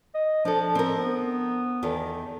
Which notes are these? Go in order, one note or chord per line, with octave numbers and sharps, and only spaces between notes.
D#5
F3 D4 A4
C4 A#4
B3
E2 D#3 A4